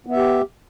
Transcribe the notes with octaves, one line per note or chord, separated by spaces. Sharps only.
B3 G4 E5